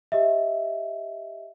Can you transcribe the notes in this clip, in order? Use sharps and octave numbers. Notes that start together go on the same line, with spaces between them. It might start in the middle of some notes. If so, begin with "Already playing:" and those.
G4 D#5 E5